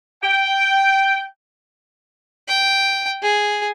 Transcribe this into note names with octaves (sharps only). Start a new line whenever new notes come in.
G5
G5
G#4